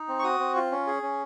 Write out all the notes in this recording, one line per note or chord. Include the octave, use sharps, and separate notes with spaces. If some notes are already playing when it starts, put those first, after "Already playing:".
Already playing: D#4
C4
C#6
F#4 D#6
C4
F4
C#4
G#4
C#4